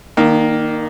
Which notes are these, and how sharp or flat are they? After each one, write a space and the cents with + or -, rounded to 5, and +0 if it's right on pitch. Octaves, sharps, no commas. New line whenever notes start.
D#3 +0 A#3 +0 D4 +40